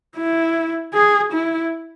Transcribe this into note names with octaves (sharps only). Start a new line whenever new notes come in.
E4
G#4
E4